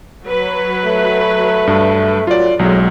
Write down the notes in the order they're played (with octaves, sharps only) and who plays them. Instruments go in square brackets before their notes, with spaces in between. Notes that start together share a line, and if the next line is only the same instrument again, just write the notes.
[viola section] F#3 B4
[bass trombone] A3
[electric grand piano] G2
[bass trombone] F#3 [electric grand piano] F4 D5
[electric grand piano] B1 F#3 [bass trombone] A2 [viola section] G#3